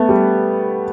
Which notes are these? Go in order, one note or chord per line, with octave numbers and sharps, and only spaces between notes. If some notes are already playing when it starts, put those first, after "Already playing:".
Already playing: A3 B3
G3